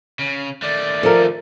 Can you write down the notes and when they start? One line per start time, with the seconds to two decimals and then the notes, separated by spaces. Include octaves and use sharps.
0.19 C#3
0.62 D#3 A3 D5
1.03 F3 A4 A#4